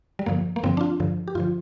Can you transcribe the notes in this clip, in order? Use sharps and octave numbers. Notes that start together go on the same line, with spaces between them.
G3
G2 D3 F3 A#3
A#3
G2 D3 F3 C4
D4
F4
G2 D3 F3
G4
G2 D3 F3 F4